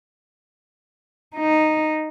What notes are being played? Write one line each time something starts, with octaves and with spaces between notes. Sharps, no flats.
D#4